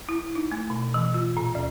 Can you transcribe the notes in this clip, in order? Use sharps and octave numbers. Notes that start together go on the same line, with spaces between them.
E4
D#4
A3
B2
E3
F4
A#2
D2